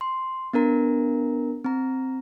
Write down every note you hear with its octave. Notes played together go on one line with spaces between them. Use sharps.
C6
B3 D4 A#4 A#5
C4 A#5